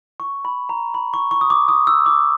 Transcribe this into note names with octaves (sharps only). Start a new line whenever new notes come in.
C#6
B5
A#5
B5
C#6
C#6
D#6
D6
D#6
E6
D6